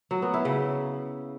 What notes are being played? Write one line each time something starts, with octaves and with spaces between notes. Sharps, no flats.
F#3
B3
E4
C#3